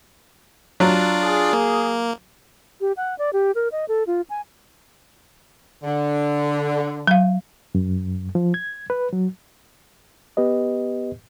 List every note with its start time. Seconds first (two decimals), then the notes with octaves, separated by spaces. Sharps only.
0.80 F#3 D4 F4 D5
1.23 G#4
1.53 A#3
2.81 G4
2.97 F#5
3.18 D5
3.33 G4
3.55 A#4
3.72 D#5
3.88 A4
4.07 F4
4.30 G#5
5.84 D3
7.07 F#3 F5
7.75 F#2
8.35 F3
8.54 G#6
8.90 B4
9.13 F#3
10.37 B3 G4 B4 D#5